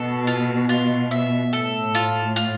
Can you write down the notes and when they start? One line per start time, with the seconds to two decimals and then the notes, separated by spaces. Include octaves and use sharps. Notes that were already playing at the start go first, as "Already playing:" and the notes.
Already playing: B2 A4
0.27 F4
0.69 F4
1.11 E5
1.53 A2 A4
1.95 F4
2.36 F4